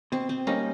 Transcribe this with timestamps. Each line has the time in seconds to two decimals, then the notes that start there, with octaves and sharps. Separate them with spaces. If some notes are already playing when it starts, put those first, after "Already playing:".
0.12 B2 C4
0.29 C4
0.47 G3 A#3 C#4 D#4